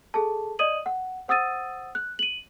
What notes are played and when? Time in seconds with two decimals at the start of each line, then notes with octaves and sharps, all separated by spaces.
0.14 G#4 A4 A5
0.59 D5 D#5 D#6 D#7 F#7
0.86 F#5
1.28 C5 F#5 D#6 E6 A6 D#7
1.95 F#6
2.19 D#7 F#7